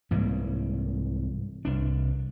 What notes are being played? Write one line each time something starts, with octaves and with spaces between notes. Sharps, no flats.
C2 G#2 E3 A#3
C2 D4